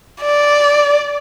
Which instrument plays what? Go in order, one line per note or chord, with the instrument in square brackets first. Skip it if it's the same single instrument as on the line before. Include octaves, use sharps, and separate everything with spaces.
[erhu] D5